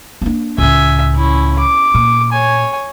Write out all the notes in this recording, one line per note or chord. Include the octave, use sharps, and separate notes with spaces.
A#3 D4
C#2 A2 E5 G#5
C#4 E4
D6
A#2
C#5 G#5